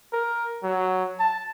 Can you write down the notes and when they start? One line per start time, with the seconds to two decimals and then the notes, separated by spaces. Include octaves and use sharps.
0.13 A#4
0.63 F#3
1.20 A5